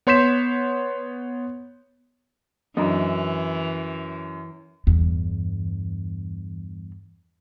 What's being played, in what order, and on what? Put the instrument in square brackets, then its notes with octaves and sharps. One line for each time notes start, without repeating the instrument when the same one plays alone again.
[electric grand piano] B3 C#5 C6 G6 B6 E7
[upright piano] F#2 [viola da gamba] E3 [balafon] F#3 D4 F#4
[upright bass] E2 G2